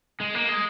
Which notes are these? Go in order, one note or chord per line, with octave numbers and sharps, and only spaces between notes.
G#3
A#3
G#3